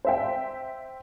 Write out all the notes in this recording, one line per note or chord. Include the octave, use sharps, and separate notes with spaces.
C5 E5 G5